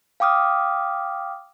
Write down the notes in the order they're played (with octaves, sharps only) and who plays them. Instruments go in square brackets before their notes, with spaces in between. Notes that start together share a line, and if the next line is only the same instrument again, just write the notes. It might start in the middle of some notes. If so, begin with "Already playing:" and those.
[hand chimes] F5 G5 D6 D#6 F6